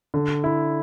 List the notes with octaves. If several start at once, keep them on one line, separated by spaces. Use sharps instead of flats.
D3
E4